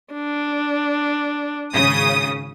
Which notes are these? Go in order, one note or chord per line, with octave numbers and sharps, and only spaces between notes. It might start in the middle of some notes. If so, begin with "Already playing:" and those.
D4
G#1 C#3 D#6